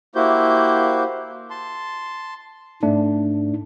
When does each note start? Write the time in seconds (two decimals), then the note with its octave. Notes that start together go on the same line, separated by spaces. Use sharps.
0.15 A#3 E4 F#4 G4 C5 G6
1.50 A5 C6
2.83 G#2 A3 D4